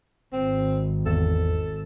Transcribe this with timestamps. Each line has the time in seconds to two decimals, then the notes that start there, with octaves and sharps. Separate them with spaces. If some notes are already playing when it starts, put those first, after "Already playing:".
0.33 G#1 C4
1.06 E2 A4